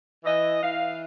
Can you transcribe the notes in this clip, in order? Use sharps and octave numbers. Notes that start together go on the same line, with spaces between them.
E3 D#5
E3 F5